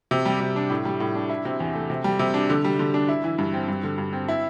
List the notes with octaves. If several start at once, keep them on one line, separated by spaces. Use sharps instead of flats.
C3
G3
C3
D4
A2
G3
A2
D4
E4
C3
E2
A3
C3
G3
C3
D4
D3
G3
D3
D4
E4
E3
G2
C4
G2
D3
G2
C4
E4